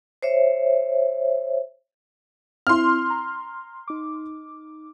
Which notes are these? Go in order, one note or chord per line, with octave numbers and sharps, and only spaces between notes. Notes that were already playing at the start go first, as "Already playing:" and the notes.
C5 C#5 E5
C4 E4 C6 F6
A#5
D#4 D6